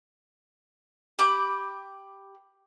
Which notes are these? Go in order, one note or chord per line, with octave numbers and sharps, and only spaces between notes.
G4 B5 D6